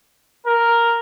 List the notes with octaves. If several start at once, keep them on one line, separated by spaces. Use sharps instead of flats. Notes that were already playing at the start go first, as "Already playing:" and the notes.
A#4